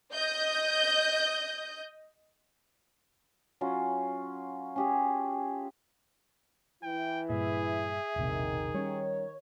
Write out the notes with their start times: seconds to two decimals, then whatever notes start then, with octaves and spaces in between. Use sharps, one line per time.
0.13 D#5 G6
3.61 F#3 C#4 F4
4.76 C#4 G4 G#4
6.83 E3 E4 G5
7.30 G2 A#2 G#4 E5
8.16 E1 A#1 C3 D#3
8.74 G3 B3 C#4 C#5